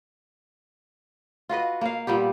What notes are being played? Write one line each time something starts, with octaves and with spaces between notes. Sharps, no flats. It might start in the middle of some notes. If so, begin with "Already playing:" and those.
F4 F#4 B4 D#5
A#3 F5
A#2 G3 B3 G4